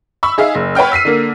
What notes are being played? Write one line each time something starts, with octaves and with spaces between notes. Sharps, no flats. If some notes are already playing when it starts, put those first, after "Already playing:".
B5 C#6 E6
D#4 G#4 E5 F5
F#1
B4 C#5 F#5 G5 F6
E6 B6 C7 D#7
D3 A#3 A#4